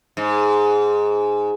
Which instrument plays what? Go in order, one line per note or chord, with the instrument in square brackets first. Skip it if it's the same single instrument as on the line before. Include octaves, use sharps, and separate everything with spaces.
[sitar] G#2